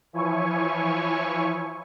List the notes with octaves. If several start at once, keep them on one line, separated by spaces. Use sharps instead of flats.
E3 F3 E4 C#5 G#5 C#6